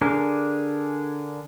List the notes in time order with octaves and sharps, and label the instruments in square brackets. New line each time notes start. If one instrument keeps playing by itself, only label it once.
[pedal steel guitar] D3 D4 G#4 A#4